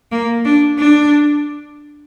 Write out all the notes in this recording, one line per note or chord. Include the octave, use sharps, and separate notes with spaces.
A#3
D4
D4